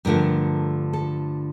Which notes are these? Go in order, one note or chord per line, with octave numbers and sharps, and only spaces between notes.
G2 D3 F3 A3 A#4
A4